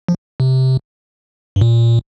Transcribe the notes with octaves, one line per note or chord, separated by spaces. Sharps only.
F3
C3
G2
A#2